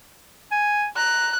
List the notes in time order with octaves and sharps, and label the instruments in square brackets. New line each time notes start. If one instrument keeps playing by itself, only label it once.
[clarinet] G#5
[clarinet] A#5 [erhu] F#6